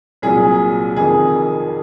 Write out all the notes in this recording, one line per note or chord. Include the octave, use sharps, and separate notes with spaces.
C2 A#2 F#3 G#4
F1 F2 D#3 G#4